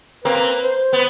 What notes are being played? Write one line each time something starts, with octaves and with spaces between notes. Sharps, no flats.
A#3 C4 B4
C5
B3